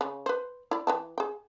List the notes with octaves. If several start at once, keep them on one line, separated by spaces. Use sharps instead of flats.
C#3
B4 C5
E4 D5
E3 G5 A5
G#4 G5